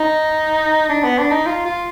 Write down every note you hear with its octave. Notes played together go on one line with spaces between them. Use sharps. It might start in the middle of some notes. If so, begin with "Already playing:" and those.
Already playing: D#4
D4
B3
D4
D#4
F4
F4